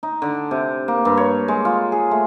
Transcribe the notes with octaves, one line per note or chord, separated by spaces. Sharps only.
D#4
D3
C3
A#3
G2
C#5
G#3
F4
G#4
A3